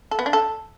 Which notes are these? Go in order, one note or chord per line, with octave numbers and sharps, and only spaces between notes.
A4
B3
D4
A4